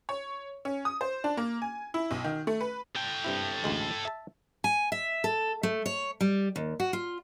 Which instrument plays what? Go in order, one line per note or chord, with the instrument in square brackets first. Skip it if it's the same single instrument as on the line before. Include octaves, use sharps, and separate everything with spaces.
[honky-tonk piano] C#5
C#4
D#6
C5
D4
A#3
G#5
E4
B1
D#3
A3
B4
[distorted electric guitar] A4 G5
[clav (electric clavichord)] G2 C3 E4
A1 D2 G#3
E5 A5
[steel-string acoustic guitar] G#5
E5
A4
A3
C#5
G3
D#2
F#4
F4